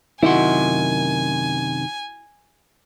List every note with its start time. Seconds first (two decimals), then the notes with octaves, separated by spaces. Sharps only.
0.23 F#2 C3 D#3 E4 F#4 G#5 C6